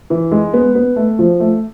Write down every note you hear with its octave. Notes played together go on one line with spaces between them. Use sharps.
E3
G#3
B3
B3
A3
F3
A3